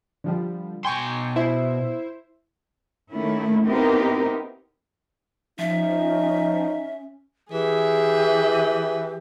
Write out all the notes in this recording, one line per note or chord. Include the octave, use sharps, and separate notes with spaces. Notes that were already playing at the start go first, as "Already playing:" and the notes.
D3 F3 G3
B2 G5 G#5 C6 C#6
E4 C5 E5
D#3 A3 A#3 C#4 E4
B3 C4 D#4 E4 G4 A#4
F3 C#4 D#4 E5
E3 G4 G#4 E5